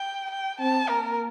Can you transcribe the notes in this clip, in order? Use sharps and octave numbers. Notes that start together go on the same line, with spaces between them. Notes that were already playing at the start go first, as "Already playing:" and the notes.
Already playing: G5
G5
C4 A5
A#3 A#4